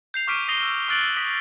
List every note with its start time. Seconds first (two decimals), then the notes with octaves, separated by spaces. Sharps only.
0.14 G6 C7 F7
0.27 C#6 D6 F6 B6 D7 D#7
0.48 D#6 A#6 C7 F7 G7
0.63 E6
0.89 C#6 F6 F#6 A6 D7 F#7
1.17 D#6 A#6 B6